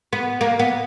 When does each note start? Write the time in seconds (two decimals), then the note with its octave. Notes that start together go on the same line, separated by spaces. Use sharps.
0.13 B3
0.41 A#3
0.59 B3